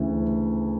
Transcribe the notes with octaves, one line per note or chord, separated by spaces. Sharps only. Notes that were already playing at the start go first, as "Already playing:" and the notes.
Already playing: D2 C#3 E3